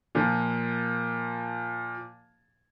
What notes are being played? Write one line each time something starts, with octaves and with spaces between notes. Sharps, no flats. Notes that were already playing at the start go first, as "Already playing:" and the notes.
A#2 F3